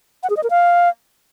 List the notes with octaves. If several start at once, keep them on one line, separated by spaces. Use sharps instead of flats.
F#5
G#4
D#5
A#4
F5